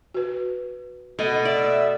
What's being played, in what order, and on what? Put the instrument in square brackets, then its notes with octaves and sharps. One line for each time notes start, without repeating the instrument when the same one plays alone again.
[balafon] F#4 B4
[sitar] B2 [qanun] A3 [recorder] D#5
[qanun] D5 [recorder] E5